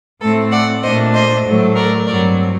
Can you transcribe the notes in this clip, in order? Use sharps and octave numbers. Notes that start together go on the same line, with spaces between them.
A2 A3 C4 A4
D5 F#5
A#2 A3 D4 C5 D#5
C5 D#5
A2 F#3 A3
A#4 D5
G2 F#3 C4 A#4 D5